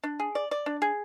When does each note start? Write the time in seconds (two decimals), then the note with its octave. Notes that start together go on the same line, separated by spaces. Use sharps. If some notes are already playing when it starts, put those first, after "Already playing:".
0.03 D4
0.20 G#4
0.35 D5
0.51 D5
0.66 D4
0.82 G#4